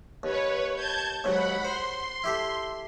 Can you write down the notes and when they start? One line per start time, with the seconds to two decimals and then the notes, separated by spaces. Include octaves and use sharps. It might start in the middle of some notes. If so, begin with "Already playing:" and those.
0.23 D#2 B4 C#5
0.74 A5 G6 G#6
1.24 D#2 G#2 F#3 F#5 B5
1.64 C5 C6
2.24 E4 G4 A4